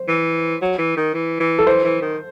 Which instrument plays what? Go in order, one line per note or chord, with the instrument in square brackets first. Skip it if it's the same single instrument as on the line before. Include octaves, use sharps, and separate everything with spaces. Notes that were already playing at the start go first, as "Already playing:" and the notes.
Already playing: [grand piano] C5
[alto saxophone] E3
F#3
E3
D#3
E3
E3
[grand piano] A4
[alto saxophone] E3 [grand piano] C5
[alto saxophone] E3
D#3